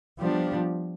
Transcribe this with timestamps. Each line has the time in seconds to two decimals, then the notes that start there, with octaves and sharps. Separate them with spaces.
0.20 F3 G3 B3 D4 G4